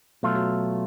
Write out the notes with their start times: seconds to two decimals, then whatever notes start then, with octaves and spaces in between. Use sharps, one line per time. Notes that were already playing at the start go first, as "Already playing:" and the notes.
0.23 B2 F#3 A3 F4
0.36 F#3